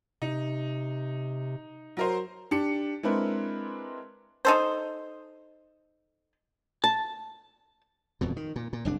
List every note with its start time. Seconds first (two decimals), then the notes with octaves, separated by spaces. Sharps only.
0.22 C3 D#4
1.97 F#3 A#4 C5
2.51 D4 G4 C#7
3.03 G#3 C4 D4 E4 A#4 B4
4.45 D#4 A4 C5
6.84 A5
8.21 D#1 F2 B2
8.37 D#3
8.56 A#2
8.73 A#2
8.85 F#1 C2 D4